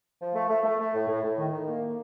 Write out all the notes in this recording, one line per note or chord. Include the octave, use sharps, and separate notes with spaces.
F3
A3
A3
A3
A3
A2
A2
A2
D#3
D#3
A#3